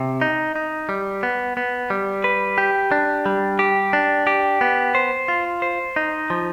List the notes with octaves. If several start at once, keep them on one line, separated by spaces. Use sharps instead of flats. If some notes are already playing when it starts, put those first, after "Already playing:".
Already playing: C3
D#4
D#4
G3
B3
B3
G3
B4
G4
D4
G3
G4
D4
G4
B3
C5
F4
C5
D#4
F3